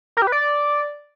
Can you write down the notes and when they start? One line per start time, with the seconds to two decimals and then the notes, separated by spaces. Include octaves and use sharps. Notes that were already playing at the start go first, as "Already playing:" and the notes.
0.17 A#4
0.22 G4
0.27 B4
0.32 D5